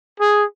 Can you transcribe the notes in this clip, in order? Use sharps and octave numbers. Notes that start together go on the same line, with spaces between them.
G#4